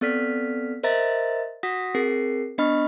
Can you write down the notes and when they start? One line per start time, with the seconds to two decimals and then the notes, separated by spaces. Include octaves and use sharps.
0.01 B3 C4 A4 D5 F6 B6
0.83 A#4 C5 D#5 E5 A#5 A6
1.63 F#4 F#5 D#6 A#6 B6
1.95 C4 G#4 A#4 C7
2.58 B3 D4 D#5 B5 C#6 F6